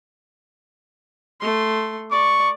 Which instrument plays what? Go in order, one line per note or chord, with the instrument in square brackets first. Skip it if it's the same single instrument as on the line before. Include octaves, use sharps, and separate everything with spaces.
[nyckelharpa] A3 C6
[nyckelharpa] D5 [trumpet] C#6